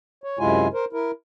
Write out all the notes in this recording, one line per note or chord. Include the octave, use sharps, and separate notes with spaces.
C#5
F#2 C3 G#3 E4 F4 G#5
A#4 C5
E4 A#4